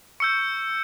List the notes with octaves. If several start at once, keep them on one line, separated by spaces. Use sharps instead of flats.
C#6 E6 G6 C#7